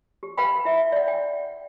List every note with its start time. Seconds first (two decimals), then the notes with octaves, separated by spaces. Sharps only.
0.23 G4
0.37 B4 F5 G5 B5
0.65 E4 E5
0.92 D5 F#5
1.08 G5